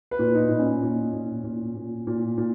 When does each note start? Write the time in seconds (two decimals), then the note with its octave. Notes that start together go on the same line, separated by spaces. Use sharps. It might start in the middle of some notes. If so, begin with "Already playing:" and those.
0.11 B4
0.19 A#2
0.35 D#4
0.50 A#2
0.59 C#4
0.82 A#2
1.13 A#2
1.44 A#2
1.76 A#2
2.07 A#2
2.38 A#2